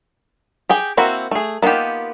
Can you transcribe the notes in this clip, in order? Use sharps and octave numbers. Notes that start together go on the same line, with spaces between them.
G4 G#4 G5
A#3 C4 E4 F#4
A3 G#4
A#3 B3 D#4 F4 G4